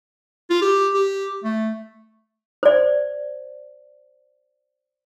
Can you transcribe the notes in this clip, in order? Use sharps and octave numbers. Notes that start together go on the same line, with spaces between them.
F4
G4
G4
A3
C5 D5